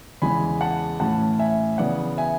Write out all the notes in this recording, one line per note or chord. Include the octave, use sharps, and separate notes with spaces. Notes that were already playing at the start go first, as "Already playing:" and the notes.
E2 C#3 E3 G#3 G#5 B5
F#5 A5
A2 E3 A3 C#4 F#5 A5
E5 G#5
C#3 E3 B3 D5 F#5
E5 G#5